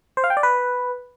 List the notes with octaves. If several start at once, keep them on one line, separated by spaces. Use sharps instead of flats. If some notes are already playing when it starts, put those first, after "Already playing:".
C5
F5
G5
D5
B4